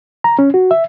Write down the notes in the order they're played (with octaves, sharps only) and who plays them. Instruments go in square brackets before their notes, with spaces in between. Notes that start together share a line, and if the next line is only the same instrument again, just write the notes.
[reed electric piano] A#5
C#4
F#4
E5